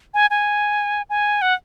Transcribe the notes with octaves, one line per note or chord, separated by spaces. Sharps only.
G#5
G#5
G#5
F#5